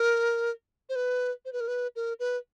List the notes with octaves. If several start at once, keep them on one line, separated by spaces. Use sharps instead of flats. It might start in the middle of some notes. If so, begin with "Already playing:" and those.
Already playing: A#4
C5
B4
C5
B4
A#4
B4
A#4
B4